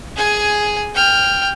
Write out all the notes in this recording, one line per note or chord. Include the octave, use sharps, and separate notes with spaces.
G#4 G#5
G5 F6